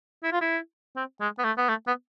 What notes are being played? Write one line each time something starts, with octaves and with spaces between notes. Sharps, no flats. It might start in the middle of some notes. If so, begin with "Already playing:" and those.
E4
F4
E4
C4
G#3
B3
A3
B3
A3
B3